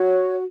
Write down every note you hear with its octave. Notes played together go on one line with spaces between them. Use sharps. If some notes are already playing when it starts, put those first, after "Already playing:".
Already playing: F#4 C#5